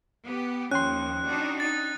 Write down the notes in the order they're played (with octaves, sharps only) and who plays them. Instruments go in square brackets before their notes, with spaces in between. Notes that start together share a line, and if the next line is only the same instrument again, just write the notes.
[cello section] B3 G4
[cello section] D#2 F3 [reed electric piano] C#4 G5 C6 [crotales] F#6
[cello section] D4 D#4 F#4
[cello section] D#4 [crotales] A6